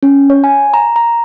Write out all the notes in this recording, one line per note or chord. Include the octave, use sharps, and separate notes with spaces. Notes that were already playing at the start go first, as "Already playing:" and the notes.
C#4
C#5
G#5
A#5
A#5